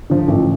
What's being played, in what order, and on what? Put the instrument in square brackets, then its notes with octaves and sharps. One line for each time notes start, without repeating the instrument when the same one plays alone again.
[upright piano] D3 F3
A1